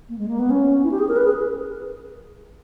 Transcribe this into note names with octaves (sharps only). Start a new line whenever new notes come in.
A#3
G#3
A#3
B3
C#4
E4
G4
G#4
A#4
B4
G#4